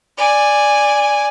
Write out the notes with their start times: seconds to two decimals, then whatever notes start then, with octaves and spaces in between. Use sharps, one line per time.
0.18 D5 G#5